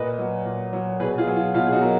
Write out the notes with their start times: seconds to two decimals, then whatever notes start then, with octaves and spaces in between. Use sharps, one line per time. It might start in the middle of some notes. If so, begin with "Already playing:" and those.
Already playing: A#2 B4 D#5
0.19 F#3
0.45 A#2
0.73 F#3
1.00 B2 G#4 B4
1.18 F4 G#4
1.27 F#3
1.36 F4
1.54 B2 F4
1.66 G#4
1.73 D#4 F#4
1.82 F#3 A#4